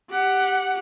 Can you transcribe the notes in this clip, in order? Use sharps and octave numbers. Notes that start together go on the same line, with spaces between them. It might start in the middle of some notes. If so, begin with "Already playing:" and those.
G4 F#5